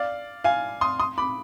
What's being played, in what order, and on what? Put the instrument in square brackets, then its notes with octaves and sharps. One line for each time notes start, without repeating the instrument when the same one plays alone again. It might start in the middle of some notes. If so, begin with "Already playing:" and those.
Already playing: [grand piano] D5 F5
F5 G#5
C6 D#6
C6 D#6
B5 D6